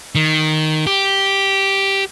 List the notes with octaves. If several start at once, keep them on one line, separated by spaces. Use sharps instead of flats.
D#3
G4